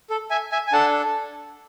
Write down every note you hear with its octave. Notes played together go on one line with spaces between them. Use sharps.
A4
E5 G#5
E5 G#5
G#5
D4 A4 F#5 A5